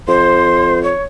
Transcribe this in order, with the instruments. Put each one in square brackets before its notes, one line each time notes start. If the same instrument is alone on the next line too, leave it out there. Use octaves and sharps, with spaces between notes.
[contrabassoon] F2 [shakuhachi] C5 [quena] C6
[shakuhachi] C#5